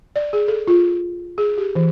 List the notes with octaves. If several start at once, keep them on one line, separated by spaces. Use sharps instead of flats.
D5
G#4
A4
F4
G#4
G4
E3